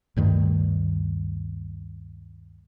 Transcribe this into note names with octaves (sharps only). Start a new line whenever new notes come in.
D2 G2 D#3 A3